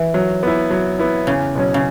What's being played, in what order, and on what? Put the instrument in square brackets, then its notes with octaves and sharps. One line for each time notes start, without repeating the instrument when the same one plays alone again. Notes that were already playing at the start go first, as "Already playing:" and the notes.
Already playing: [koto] E3
[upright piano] F#3
B3 E4
F#3
B3 E4
[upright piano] E2 [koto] C#3
[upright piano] B2 F#3 C#4
[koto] C#3